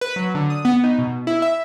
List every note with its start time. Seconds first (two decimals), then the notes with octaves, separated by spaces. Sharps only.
0.01 B4
0.16 F#3
0.35 D3
0.50 D#6
0.65 B3
0.84 D#4
0.99 B2
1.27 E4
1.42 E5